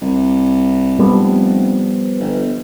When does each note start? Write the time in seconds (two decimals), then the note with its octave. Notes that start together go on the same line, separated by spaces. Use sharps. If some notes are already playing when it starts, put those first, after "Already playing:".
0.01 C2
0.98 F1 F3 G3 B3
2.20 G1